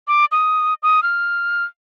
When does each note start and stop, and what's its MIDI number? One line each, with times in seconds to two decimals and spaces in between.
0.08 0.25 86
0.32 0.74 87
0.83 1.03 87
1.03 1.64 89